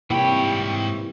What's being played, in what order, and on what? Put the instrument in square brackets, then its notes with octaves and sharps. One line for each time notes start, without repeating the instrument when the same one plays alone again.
[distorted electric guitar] G#2 B5 [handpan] C3 G3 A#3 [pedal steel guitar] E3 C#5 [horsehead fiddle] G5